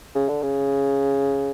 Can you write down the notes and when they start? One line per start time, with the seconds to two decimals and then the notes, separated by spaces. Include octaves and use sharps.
0.15 C#3
0.28 D3
0.42 C#3